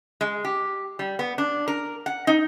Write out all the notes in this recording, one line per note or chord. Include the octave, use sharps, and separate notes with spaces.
G#3
G4
G3
B3
D4
A#4
F#5
D#4